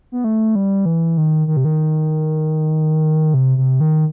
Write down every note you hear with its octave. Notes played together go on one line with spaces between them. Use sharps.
B3
A3
G3
E3
D#3
D#3
C3
D#3
C3
C3
D#3